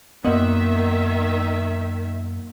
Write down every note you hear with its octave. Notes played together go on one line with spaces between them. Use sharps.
F#2 A#2 D#3 B3 D#5 E5 F#5